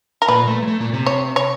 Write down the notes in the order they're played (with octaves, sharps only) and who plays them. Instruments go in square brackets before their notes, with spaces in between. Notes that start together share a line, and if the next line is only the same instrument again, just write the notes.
[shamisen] A#4
[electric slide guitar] A#2 A#3 [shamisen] B4
[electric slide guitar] A3
G#3
A3
A#2 A#3
C3 C4
[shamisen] C#5
C#5